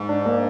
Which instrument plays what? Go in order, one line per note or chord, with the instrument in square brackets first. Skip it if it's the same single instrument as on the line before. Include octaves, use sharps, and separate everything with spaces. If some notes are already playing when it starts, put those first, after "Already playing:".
Already playing: [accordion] G#2
[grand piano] D4
A#3